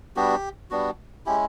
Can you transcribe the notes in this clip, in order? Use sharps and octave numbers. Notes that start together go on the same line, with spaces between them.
G3 B3 D4 F#4 G4
G3 B3 D4 F#4
G#3 C#4 E4 G4